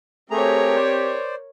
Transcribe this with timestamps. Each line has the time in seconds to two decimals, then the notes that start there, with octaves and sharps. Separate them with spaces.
0.31 A3 C4 G4 G#4 A#4 C#5 A#5
0.76 C5 D5